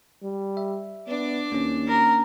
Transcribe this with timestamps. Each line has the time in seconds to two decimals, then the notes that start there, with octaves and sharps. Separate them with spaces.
0.23 G3
0.57 E5
1.08 B3 D4 D5
1.52 D#2 A#3 C#4
1.88 A#4